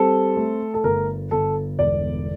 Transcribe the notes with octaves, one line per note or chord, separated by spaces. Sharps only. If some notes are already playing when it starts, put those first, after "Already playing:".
Already playing: G3 C4 A4
A3
A4
G1 A#4
G1 A4
E1 D5